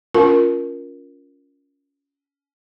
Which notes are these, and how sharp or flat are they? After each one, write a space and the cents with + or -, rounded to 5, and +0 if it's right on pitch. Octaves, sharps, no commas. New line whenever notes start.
C#4 +25 F4 +5 A#4 +5